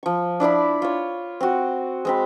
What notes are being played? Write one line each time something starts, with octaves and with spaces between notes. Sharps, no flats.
F3 C#6
D4 E4 D5 B5
F4 C#5
C4 F#4
G#3 C4 B5